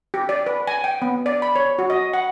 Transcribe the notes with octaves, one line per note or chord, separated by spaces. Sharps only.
G4
D5
B4
G#5
G5
B3
D5
B5
C#5
F#4
D#5
F#5